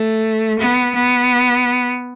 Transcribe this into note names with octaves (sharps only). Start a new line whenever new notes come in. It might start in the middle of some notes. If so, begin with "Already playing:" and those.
Already playing: A3
B3
B3